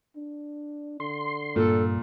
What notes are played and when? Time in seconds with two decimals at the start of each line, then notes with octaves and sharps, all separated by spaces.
0.16 D4
1.00 D3 C6
1.56 G2 A#2 A4